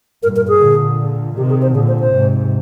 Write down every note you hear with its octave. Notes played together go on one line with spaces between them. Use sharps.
G2 A#2 A#4
A#4
G#4
A#2 D3
C3 D#3 G4
G#4
C5
A#2 D3 G#4
C5
C5
G#2 C3